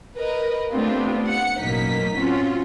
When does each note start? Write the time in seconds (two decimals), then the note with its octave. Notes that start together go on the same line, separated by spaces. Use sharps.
0.16 A#4 B4 D#5
0.73 A3 B3 C4 D4 F4 G4
1.28 F#5 C#7
1.61 A1 F#2 B2 A#3 D#4 B6
2.18 C4 C#4 F4 F#4